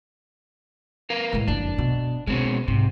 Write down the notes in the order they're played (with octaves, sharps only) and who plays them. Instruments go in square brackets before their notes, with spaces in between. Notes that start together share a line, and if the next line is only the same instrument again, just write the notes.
[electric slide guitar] A#4 B4 F5
[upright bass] A2 G#3
[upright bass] F#1 F2 [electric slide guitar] D4
[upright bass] B2
[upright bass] B2 [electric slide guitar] G#3 C4 C#4
[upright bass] G#2 [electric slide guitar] C3